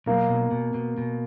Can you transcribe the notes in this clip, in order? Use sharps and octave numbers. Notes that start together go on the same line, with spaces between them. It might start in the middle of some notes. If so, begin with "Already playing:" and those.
B1 A#3
B2
B2
B2
B2